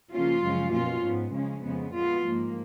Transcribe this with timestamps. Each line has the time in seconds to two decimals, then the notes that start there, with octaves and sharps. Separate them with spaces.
0.13 C#3 F3 A#3 C#4 F4
0.44 F#2 C#3 F3 G#3 C#4
0.74 B2 A#3 C#4 F4
1.04 G#2 F3 B3
1.34 C#3 F3 G#3 C#4
1.64 F2 C#3 F3 G#3 B3
1.94 A#2 G#3 B3 F4
2.24 G#2 F3 A#3